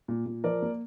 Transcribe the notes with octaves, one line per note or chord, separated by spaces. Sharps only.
A#2
A#2
F3 A#4 D5
A#3